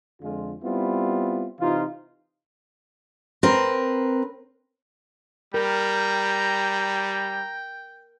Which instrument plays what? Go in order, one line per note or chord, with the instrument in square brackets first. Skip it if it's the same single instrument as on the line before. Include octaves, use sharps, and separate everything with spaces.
[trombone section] F2 D3 G#3 F4
G3 B3 C4 E4 F4
C3 E3 D#4 F4
[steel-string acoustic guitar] C4 A#4 B4
[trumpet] G3 [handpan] A#4 [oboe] G5 [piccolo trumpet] A#5